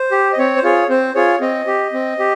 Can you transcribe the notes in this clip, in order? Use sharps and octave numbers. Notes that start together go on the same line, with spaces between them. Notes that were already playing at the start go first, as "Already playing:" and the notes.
Already playing: C5
G4
D#5
C4 C#5
C5
F4 G#4 C#5
C4 C5
F4 G#4 C#5
C4 D#5
G4
C4
G4